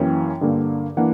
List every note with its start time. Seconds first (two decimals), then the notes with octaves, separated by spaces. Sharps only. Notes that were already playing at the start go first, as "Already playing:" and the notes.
Already playing: F#2 E3 A#3 C#4 G5
0.41 G2 D3 A#3
0.97 E3 A#3 D4 F#5